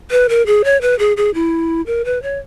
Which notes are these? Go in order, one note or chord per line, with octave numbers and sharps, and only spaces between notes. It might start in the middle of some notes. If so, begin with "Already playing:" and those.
B4
A#4
G#4
C#5
B4
G#4
G#4
E4
A#4
B4
C#5